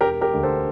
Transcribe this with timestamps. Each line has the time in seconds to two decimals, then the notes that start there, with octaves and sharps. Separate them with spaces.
0.01 E1 G4 A#4
0.21 G4 A#4
0.33 D2 D3
0.43 A4 C5